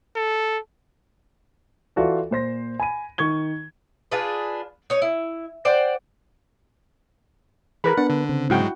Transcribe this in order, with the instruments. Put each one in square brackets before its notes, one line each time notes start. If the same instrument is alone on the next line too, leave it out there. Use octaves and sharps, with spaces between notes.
[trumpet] A4
[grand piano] E3 F4 F#4 A4 D5
A#2 C5 A#6
G#5 B5 D#7
D#3 C#6 G#6 G7
[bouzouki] D4 F4 G#4 B4
D#4 C#5
E4
C5 D5 F#5 G5
[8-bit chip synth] E3 [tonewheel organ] G#4 [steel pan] A#4 B4 B5
[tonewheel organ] B3 [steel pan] D4 [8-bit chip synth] F#5
[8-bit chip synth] D3
[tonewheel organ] C#3 C4
[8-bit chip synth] G#2 F#3 G#3 [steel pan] E4 F#4 G5